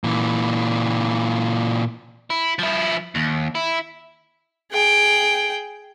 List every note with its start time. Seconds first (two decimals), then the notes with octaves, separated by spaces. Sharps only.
0.04 A#2 E3
2.30 E4
2.59 F3 E4
3.15 D#2
3.55 E4
4.72 G#4 G5